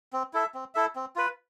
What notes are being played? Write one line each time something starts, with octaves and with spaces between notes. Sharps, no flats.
C4
E4 A4 E5
C4
E4 A4 E5
C4
F4 B4